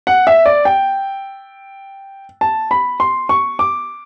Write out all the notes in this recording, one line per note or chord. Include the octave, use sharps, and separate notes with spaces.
F#5
E5
D5
G5
A5
B5
C6
C#6
D6